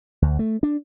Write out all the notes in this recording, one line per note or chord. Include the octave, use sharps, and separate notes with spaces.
D2
A3
D4